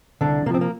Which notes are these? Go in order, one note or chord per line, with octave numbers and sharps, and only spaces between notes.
C2 D3 D4
C3 F3 A#3 C4
A#3